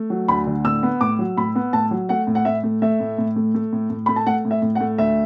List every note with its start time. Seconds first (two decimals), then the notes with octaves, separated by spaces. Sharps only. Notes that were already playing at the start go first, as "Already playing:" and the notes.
Already playing: A3
0.10 F#3
0.28 D2 B5
0.47 D3
0.65 A2 E6
0.83 B3
1.01 A2 D6
1.19 F#3
1.37 A2 B5
1.55 B3
1.73 A2 A5
1.91 F#3
2.09 A3 F#5
2.27 A2
2.35 F#5
2.45 A2 E5
2.63 A3
2.82 A3 E5
3.00 A2
3.18 A2
3.36 A3
3.54 A3
3.73 A2
3.90 A2
4.06 A3 B5
4.16 A5
4.27 A3 F#5
4.45 A2
4.51 E5
4.62 A2
4.75 F#5
4.80 A3
4.98 D2 E5